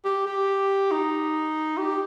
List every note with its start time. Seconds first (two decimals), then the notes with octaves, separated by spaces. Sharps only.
0.05 G4
0.26 G4
0.91 D#4
1.77 G4